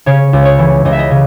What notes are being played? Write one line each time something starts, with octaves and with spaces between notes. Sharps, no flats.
C#3 C#5
C#2
C#5
E3
C#2 D#5
E5
D#5
C#3